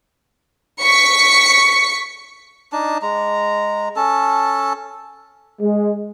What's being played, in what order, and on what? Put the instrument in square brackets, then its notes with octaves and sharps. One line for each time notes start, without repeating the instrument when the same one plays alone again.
[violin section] C#6 B6 C#7
[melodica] D4 D#4 A5
G#3 A#5
C#4 A4 A5
[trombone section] G#3